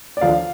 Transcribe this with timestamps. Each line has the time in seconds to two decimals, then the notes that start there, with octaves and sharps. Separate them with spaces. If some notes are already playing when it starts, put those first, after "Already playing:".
0.17 D5
0.21 D2 D3 F3 F5